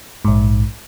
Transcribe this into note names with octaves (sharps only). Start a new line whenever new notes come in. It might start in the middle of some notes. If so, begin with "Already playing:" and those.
A#1 G#2